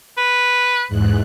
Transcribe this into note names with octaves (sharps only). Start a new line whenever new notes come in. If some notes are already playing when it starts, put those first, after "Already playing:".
B4
E2 G#2 F#6